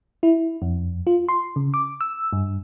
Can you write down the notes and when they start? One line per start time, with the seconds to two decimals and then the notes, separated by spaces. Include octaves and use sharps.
0.23 E4
0.62 F2
1.07 F4
1.29 C6
1.56 C#3
1.74 D6
2.01 E6
2.33 G2